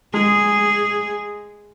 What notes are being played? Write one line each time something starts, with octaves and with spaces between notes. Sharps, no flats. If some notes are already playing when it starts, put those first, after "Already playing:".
G#3 G#4